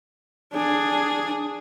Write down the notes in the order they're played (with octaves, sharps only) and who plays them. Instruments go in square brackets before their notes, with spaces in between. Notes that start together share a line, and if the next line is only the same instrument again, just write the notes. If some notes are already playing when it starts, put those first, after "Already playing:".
[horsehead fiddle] D4 G#4